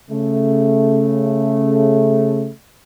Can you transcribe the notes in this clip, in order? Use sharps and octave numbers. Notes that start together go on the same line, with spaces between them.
C#3 A3